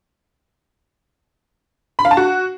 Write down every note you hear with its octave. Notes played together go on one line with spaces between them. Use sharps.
B5
F5
A5
F#4